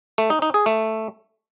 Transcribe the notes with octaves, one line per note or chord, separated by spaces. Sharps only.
A3
D#4
D#4
G#4
A3